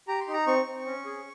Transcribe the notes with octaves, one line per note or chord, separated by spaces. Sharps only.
G4 A#5
C6
D#4
A#5
C4 C#6
C4
C#4
G#4